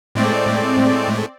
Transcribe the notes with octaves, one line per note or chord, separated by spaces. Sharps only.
A2 G#3 A3 C4 D5